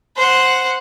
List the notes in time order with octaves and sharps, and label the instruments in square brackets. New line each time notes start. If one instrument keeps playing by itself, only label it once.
[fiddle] C5 F#5